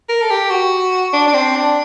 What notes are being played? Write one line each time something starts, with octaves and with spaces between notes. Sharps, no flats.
A#4
A4
G4
F#4
D4
D4
C4
D4